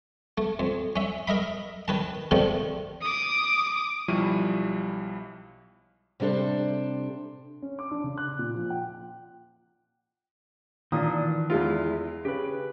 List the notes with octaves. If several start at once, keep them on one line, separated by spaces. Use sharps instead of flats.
A3
F2
C#4 E5
A#4 D#5 E5 B5
D#3 B4 A5
G#2 C3 D#3 F3 G3 A3
D6 D#6
B1 F3 G3 E4 C#6 D#7
C3 G3 D4 A4 C5
C#4
D6
D4
C#3
F#6
A#2
F3
G5
A#2 D#3 E3 D4 D#6
E2 G#3 E4 F4
C#3 G4 B4